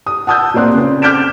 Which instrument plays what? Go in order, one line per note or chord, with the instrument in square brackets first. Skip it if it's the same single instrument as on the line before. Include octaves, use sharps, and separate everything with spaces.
[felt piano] D#6
F#5 A5 D#6 E6 G6
A#2 A#3 C4 D5 C6 F#6
C#3 C4
D6 F6 G6 B6 D7 E7